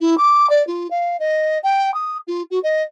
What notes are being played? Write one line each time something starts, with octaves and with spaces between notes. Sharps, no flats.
E4
D6
D5
F4
F5
D#5
G5
D#6
F4
F#4
D#5